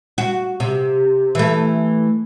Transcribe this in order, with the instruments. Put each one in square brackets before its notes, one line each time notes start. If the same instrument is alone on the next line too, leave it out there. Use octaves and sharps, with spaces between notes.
[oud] F#4
C3
E3 A3